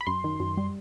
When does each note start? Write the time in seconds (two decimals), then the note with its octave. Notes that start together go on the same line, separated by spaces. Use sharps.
0.01 B5
0.07 F#2 C6
0.24 D#3
0.40 F#2
0.57 G3